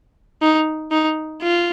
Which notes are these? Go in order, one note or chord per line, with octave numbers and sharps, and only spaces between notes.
D#4
D#4
F4